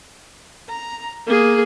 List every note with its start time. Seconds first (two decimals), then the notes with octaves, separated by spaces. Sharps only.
0.69 A#5
1.26 A#3 G#4